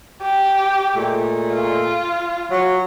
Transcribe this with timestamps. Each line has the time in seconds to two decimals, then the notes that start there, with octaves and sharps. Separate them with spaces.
0.23 G4
0.96 A#2 G#3 A3
1.54 F4
2.51 F#3